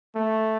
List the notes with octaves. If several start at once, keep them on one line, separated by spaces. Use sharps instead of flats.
A3